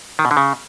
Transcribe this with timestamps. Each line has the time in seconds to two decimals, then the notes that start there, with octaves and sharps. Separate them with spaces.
0.19 D#3
0.25 B2
0.31 D3
0.37 C#3